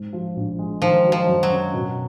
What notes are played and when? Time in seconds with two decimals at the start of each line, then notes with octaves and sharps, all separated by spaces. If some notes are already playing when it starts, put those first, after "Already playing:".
Already playing: G#2
0.13 F3
0.36 A#1
0.59 G#3
0.82 D#3 F3
1.04 F#3
1.12 F3
1.27 F#2
1.43 F#3
1.50 C#4
1.74 B2